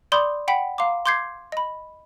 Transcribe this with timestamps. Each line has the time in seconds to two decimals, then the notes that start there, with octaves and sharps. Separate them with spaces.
0.12 D5 B5 C6 D6 D#6 G6
0.48 F#5 G5 B5 B6
0.78 F5 A#5 C6 D6
1.06 C6 D6 G6 G#6 C7
1.52 D#5 B5